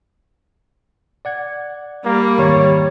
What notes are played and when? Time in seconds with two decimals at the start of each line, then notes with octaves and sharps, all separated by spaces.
1.25 D5 F#5 G#6
2.05 G3 A#3
2.39 D#2 G#2 C#5